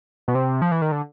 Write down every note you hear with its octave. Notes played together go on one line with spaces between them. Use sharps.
B2
C3
F3
E3
D#3
D3